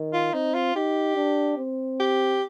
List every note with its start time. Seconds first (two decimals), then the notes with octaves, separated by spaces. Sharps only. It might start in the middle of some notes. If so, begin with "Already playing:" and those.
Already playing: D#3
0.13 F4
0.34 C4 D#4
0.54 F4
0.75 D#4 G4
1.16 D4
1.57 C4
2.00 G4